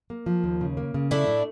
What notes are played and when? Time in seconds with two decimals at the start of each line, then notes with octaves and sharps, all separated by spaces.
0.10 A#3
0.26 F3
0.44 D#2
0.61 C#3
0.77 A#3
0.94 C#3
1.11 A3 D4 E4
1.28 A2